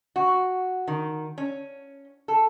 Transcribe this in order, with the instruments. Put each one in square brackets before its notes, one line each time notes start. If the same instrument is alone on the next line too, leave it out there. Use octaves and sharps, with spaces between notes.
[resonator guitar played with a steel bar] F#4
D#3
C#4
A4